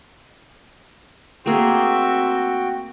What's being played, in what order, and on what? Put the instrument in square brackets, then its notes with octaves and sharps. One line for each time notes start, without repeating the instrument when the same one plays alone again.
[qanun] A3 A#3 G#4 [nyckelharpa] C4 E5 [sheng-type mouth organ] F#4 G5